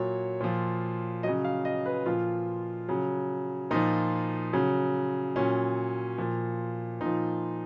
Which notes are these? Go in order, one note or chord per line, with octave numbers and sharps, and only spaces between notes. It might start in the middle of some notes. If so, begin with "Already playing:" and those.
Already playing: A#2 F#3 C#5
A#2 F3
C#3 F#3 D#5
F5
D#5
B4
A#2 F3 F4
C#3 F#3
A#2 F3 D#4
C#3 F#3
A#2 F#3 C#4
A#2 F3
A#2 F3 D#4